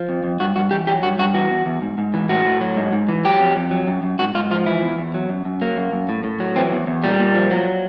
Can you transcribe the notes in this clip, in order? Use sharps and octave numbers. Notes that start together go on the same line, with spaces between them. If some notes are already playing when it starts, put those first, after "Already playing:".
Already playing: F3
F2
F2
G2 F#4
G2 F#4
E3 G4
F#3 G4
G2 F#4
G2 F#4
E3 F#4
E2
E2
G#2
G#2
E3
A2 F#4
A2
F#3
G#2
G#2
E3
F#3 G4
F2
F2
F#3
F#2
F#2
G#2 F#4
G#2 F4
F3 F4
E3 E4
E2
E2
F#3
F#2
F#2
F#3 A#3
F#2
F#2
A2
A2
F#3
E3 C4
E2
E2
A#2 G3
A#2
F3
F#3